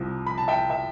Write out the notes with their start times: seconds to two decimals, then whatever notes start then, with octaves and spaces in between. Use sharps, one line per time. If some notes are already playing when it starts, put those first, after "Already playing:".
Already playing: C2 C3 F3
0.26 B5
0.38 A5
0.48 E5 G5
0.70 E5